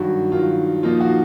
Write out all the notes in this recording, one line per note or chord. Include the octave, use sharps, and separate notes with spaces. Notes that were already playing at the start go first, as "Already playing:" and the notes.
Already playing: G2 D#3 F#3 F#4
G2 D#3 F#3 F4
A#2 F3 A#3 D#4 F4
F#4